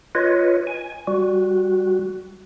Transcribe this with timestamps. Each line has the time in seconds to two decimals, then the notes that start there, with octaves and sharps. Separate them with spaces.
0.15 F4 B4 C#5 D#5
0.67 G#5
1.07 G3 F#4